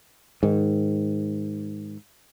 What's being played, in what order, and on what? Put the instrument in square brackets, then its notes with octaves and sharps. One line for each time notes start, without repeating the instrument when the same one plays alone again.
[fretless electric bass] G#2 D#3